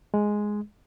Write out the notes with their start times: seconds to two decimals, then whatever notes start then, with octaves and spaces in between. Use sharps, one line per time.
0.14 G#3